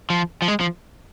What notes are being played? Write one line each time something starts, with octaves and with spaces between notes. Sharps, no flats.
F3
F3
G#3
F3